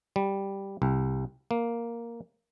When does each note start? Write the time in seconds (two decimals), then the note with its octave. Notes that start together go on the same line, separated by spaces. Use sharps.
0.16 G3
0.82 C2
1.51 A#3